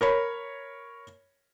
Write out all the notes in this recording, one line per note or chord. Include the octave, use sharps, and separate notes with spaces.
A#4 C#5 B5